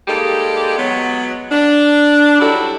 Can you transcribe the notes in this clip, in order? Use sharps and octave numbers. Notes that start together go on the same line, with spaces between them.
G3 G#3 A#3 D#4 G4 A4
F#3 G#3 B3
D4
F#3 G3 D#4 E4 F#4 A4